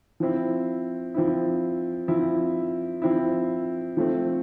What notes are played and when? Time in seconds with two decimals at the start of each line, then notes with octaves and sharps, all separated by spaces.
0.20 F3 C4 E4
1.14 F3 C4 E4
2.08 F3 C4 E4
3.02 F3 C4 E4
3.97 F3 A3 C4